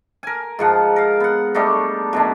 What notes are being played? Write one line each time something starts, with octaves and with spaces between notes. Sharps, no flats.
A#4 G#5
G#2 F3 F#5
A#4 F5
B3 F#5
G3 A3 D4 D#4
F#2 B2 D4